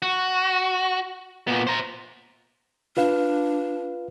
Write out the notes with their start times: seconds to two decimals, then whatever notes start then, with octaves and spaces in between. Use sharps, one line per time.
0.02 F#4
1.47 A#2 B3
1.67 C5 A#5
2.97 D4 F4 B4 F5